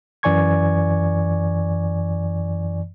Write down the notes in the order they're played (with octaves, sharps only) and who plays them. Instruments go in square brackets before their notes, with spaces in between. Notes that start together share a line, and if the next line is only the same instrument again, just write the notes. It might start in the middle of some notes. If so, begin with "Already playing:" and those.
[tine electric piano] F#2 E3 D5 G#5 C#6 G#6